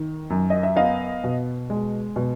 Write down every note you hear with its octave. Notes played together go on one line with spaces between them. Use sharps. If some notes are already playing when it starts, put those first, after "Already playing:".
Already playing: D#3
F#2
D#5
E5
B3 D#5 F5
B2
G#3
B2